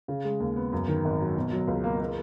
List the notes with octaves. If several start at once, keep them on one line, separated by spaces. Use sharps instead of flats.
C#3
G#3
D#2
B3
F#2
D#3
G#1
F#3
B2
F#3
C#2
A#3
A#3